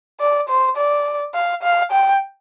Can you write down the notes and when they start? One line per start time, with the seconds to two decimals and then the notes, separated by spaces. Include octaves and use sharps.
0.20 D5
0.49 C5
0.77 D5
1.34 F5
1.63 F5
1.92 G5